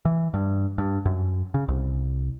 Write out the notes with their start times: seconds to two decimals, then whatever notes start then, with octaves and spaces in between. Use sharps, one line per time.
0.05 E3
0.34 G2
0.78 G2
1.06 F#2
1.54 C#3
1.68 C2